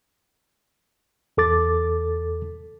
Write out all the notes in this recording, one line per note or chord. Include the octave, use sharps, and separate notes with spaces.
E2 A4 D6 A6